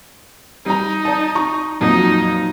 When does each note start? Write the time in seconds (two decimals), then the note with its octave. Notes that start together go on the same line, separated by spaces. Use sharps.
0.66 G3 D#4 A#5
1.05 D5 A5
1.35 A#5 C#6
1.81 F2 A#2 F#3 D#4